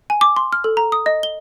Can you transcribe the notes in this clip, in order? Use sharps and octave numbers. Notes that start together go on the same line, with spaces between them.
G#5
D6
C6
F6
A4
A#5
D#6
D#5
G7